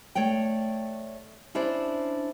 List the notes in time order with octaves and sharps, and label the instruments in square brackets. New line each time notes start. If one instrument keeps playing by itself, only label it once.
[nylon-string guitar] A3 C#5 D5 G5
C#4 D4 E4 C5 D5